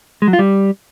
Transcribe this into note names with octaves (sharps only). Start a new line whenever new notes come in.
G#3
F#3
F4
G3